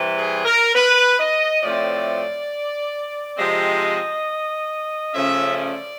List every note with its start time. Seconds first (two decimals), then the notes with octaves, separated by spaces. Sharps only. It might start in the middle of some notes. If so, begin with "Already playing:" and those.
Already playing: C3 E3 G3
0.17 G#4
0.45 A#4
0.75 B4
1.19 D#5
1.62 A2 F3 A3 C4 D5
3.37 C3 F3 G#3 C4 D#5
5.13 C#3 F3 A3 C#4 E5
5.57 D5